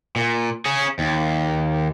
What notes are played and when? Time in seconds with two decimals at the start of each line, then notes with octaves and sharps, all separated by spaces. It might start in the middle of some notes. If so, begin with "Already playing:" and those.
0.16 A#2
0.65 C#4 G#4
0.99 D#2